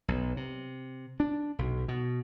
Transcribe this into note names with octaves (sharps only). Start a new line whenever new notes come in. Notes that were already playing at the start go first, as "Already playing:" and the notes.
B1
C3
D4
B1
B2